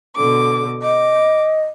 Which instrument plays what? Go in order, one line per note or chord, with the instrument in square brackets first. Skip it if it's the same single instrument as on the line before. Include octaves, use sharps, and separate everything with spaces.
[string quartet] B2 D3 D6
[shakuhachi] D#5 [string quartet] D6